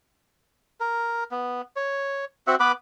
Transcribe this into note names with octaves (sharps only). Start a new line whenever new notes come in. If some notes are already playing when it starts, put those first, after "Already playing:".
A#4
B3
C#5
C4 F#4 E5 F#5
B3 B4 B5 D6